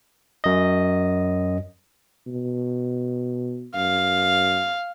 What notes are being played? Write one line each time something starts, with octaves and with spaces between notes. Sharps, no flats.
F#2 D#5
B2
F#2 F5